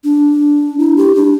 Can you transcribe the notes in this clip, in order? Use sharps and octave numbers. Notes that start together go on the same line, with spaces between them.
D4
E4
G4
D4